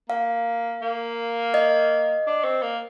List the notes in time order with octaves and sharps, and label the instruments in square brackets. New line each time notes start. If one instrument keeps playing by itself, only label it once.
[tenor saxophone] A#3 [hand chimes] F5
[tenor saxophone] A#3
[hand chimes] D#5
[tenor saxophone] D4
C4
A#3